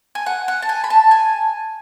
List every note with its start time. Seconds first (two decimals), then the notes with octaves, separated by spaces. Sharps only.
0.15 G#5
0.26 F#5
0.48 F#5
0.62 A5
0.69 G#5
0.84 B5
0.90 A5
1.11 G#5